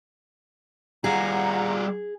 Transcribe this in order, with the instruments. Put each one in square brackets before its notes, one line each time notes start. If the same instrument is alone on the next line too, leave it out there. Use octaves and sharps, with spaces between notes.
[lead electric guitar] G3 F4 [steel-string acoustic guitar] G#4 [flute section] F#5 A#5